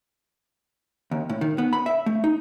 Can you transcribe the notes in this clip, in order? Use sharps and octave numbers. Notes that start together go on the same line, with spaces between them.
D#2
A2
D#3
B3
B5
E5
A3
D#4